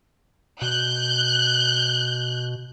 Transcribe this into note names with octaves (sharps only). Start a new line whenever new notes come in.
B2 F#6 G6